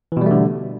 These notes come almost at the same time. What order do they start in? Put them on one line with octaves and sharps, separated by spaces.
E3 B2 G3 A3 D3